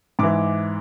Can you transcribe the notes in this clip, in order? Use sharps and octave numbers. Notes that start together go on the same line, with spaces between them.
G#2 E3 D6